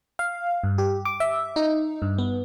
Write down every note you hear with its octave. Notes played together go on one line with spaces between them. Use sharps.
F5
G2
G4
D6
E5
D#4
G2
B3